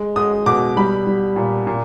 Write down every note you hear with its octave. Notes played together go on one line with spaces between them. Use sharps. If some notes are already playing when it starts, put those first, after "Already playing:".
Already playing: G#3
G#3 D#6
B2 D6
G3 B5
G3
A#2
A#2